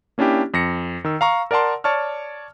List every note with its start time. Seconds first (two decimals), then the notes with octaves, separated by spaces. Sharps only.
0.18 A#3 C#4 D4 E4 G4
0.54 F2 A#6 C#7
1.04 D#3 E6
1.21 F5 A#5 C#6
1.51 A#4 D5 F#5 A5 C6
1.84 C#5 D5 A5 C#6 F6